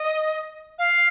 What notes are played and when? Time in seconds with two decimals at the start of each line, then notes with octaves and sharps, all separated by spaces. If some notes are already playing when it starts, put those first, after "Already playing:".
Already playing: D#5
0.78 F5